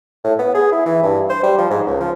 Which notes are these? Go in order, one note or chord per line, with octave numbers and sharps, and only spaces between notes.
A2
B3
G#4
E4
E3
G2
C5
G3
F3
G#2
C#2
F3